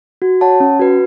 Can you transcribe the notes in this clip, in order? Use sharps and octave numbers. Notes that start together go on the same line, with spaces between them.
F#4
C#5 F#5 A5
C#4
F#4 B4